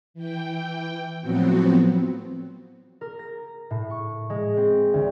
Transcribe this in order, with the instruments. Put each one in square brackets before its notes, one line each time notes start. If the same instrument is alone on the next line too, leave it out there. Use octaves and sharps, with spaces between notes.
[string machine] E3 G5
A2 F3 F#3 B3 C4 F#4
[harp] A#4
A#6
A2
C#6
G#3
C4
D2